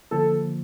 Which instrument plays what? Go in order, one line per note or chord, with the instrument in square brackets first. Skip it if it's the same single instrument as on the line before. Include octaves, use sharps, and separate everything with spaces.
[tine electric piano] D3 F3 A#3 [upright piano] A4